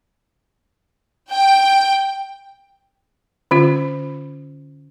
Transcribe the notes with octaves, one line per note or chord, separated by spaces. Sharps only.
G5
D3 C#4 F4